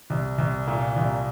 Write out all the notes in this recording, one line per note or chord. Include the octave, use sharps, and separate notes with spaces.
C2
C2
A#2
C2